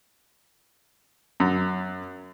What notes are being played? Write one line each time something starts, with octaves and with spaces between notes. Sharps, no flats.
F#2